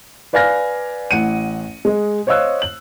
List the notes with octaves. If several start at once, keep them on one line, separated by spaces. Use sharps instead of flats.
B4 D5 F5 G#5 F6 A#6
A1 F#5 C#7 D#7
G#3 D#5
C5 C#5 D#5 F5 E6 F#6
F#7